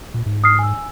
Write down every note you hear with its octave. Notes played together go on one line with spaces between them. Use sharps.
A#2
G#2
D#6 F6 C7
G#5 E6